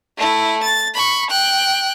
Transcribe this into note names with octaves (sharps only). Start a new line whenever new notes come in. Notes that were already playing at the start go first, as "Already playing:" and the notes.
A3 E4
A6
B5 C#6
G5 F#6